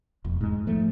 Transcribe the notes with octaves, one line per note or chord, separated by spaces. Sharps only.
E1 F2
G#2 G#3
G#2 F3 A3